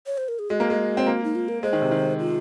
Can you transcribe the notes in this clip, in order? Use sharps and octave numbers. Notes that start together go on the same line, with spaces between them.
C#5
C5
A#4
G#4
G#3 F#4
A#3
G#3
C4
A#3
D#4
F4
A#4
G#3 C5
D#3
C3
D#3
F4